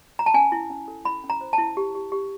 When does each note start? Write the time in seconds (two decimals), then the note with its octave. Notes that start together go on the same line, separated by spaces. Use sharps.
0.19 A#5
0.26 A5
0.34 C#4 G#5
0.52 E4
0.70 C#4
0.88 A4
1.05 E4 B5
1.24 C#4
1.30 A#5
1.41 C5
1.53 A5
1.58 E4
1.77 G4
1.95 G4
2.12 G4